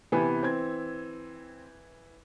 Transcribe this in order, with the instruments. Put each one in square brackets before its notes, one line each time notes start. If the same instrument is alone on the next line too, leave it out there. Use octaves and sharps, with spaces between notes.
[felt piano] C3 B3 G#5 [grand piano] E3
[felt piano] C4 G#6